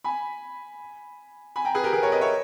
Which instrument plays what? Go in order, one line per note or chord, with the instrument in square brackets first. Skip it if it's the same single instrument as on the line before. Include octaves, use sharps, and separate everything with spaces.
[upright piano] G#5 B5
G#5 B5
G5 A#5
G#4 B4
G4 A#4
G#4 B4
A#4 C#5
B4 D#5
C#5 E5